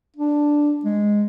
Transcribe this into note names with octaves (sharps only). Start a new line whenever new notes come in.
D4
G#3